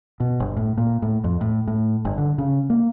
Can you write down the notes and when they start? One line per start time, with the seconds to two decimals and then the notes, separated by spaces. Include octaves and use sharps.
0.20 B2
0.40 G1
0.57 A2
0.78 A#2
1.02 A2
1.24 F2
1.41 A2
1.67 A2
2.05 G1
2.18 D3
2.38 C#3
2.70 A#3